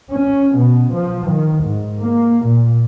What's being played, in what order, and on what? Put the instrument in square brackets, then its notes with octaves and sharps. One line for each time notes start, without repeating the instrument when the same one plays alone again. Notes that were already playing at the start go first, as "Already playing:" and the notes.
[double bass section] C#4
B2
F3
D#3
G#2
A#3
A#2